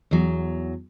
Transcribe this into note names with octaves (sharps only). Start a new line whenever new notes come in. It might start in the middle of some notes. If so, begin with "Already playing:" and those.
E2 F#3